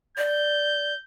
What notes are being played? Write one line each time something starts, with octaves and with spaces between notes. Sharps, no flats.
D5 G6